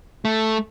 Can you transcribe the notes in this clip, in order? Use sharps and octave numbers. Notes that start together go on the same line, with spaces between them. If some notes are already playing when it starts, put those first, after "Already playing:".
A3